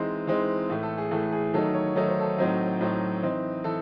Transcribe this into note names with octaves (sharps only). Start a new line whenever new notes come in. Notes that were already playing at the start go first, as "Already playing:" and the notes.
Already playing: E3 G#3 C4 D#4 C5
E3 G#3 C4 D#4
A2 E3 A3
A4
G#4
A2 E3 A3 A4
G#4
D#3 F#3 A3 D#4 A4
C#5
D#3 F#3 A3 D#4 A4
C5
A4
A2 F#3 C4 D#4
A2 F#3 C4 D#4
E3 C4 D#4
E3 A4